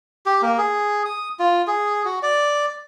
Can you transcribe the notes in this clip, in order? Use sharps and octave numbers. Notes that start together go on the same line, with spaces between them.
G4
A#3
G#4
D#6
F4
G#4
F#4
D5